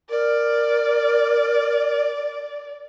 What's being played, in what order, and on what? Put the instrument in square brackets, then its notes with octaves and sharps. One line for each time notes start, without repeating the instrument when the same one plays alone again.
[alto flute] A#4 [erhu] D5